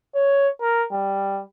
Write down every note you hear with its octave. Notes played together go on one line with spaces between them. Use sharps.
C#5
A#4
G3